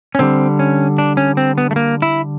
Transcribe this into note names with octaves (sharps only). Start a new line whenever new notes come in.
C#4
D3 G3 C4
C#4
D4
C#4
C4
B3
A3
A#3
E4